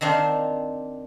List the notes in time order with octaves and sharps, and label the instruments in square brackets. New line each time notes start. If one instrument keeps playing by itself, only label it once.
[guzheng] D#3 C4 D4 F5